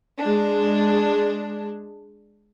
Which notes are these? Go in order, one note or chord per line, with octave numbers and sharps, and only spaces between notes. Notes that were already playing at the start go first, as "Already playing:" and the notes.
G#3 D4